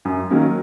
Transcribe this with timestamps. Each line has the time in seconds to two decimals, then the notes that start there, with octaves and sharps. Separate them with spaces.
0.05 F#2
0.30 D#3 F#3 A#3 C#4